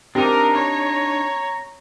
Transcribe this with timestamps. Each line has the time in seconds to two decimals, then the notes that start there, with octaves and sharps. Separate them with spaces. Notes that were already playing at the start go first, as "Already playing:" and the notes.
0.15 C4 D4 D#4 G4 A#4 A#5
0.54 C#5